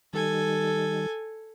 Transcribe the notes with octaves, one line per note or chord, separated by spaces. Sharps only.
D#3 G3 A4 G#5